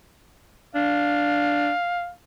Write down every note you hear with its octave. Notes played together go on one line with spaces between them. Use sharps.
D4 F5